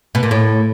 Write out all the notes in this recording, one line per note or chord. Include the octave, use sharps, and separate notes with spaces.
B2
A#2
A2